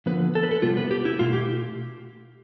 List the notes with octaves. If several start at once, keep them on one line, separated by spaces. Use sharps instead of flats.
D3 F3 B3 B4
A4
B4
A4
C3 G3 B3 F4
B4
G4
E4
B2 A3 F4
G4